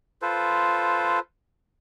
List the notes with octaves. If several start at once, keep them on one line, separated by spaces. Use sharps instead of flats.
F4 A4 B4 C5